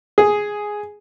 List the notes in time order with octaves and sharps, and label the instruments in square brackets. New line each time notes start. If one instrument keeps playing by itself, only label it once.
[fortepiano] G#4